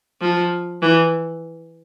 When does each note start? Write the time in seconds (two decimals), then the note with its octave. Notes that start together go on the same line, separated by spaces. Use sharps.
0.21 F3
0.82 E3